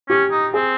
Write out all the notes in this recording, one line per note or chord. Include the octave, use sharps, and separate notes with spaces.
C#4 G4
D#4
C4 G#4